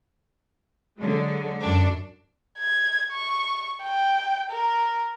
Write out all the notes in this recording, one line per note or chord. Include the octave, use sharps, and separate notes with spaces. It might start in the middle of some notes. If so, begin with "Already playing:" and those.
D3 F#3 G#3
F#2 D4
G#6
C#6
G5
A#4